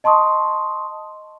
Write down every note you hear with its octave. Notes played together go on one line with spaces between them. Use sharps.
D#5 A5 C6 C#6 D#6